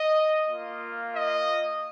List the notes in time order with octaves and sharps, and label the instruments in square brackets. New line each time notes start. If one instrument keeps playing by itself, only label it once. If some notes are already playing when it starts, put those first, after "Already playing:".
Already playing: [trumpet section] D#5
A#3 F4
D#5